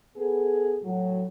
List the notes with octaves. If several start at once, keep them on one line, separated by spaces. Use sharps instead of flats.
B3 G#4 A4
A2 F#3 F#4